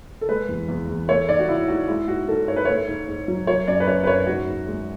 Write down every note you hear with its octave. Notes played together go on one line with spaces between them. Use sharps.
A4
G#3 B4
E2
E2
E2
A3 C#5
G#2 D5
F#4
E3 E4
G#2 F#4
G#3 E4
G#2 F#4
G#2 A4
G#2 C#5
B4
A3 C#5
G#2
G#2
F#3
F#3 C#5
F#2 D5
B4
F#2 C#5
B4
F#2 C#5
G#2 F#4
G#2
G#3